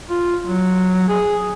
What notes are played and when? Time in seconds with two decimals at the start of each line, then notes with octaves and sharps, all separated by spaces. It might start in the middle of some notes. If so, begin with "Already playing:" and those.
0.10 F4
0.43 F#3
1.09 G#4